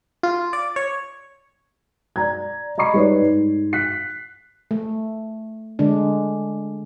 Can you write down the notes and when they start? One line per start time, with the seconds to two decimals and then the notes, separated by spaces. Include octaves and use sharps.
0.23 F4
0.53 D5
0.76 C#5
2.16 D5 A#5 G#6
2.78 D#5 A#5 B5 C#6 C7
2.94 G3 D#4 B4 C#5 D5
3.20 G#2
3.73 F#6 B6 C7
4.71 A3
5.79 D3 G#3 D4